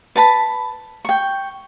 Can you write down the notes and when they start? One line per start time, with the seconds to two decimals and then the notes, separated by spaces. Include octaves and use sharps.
0.16 B4 A5 B5
1.05 G5 C#6